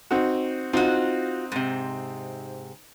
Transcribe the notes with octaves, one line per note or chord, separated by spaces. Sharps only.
C4 D#4 F#4
C4 D#4 F4 F#4
G#2 C3